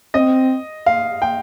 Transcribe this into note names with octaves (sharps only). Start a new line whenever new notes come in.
C4 D#5
F5
G5